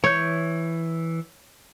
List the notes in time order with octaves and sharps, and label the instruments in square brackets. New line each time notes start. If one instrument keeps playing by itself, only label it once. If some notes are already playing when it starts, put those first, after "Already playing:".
[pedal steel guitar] E3 G6 [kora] C#5